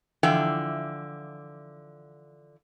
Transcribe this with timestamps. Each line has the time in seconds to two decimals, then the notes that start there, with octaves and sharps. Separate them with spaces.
0.23 D3 E3 F3 E5 G5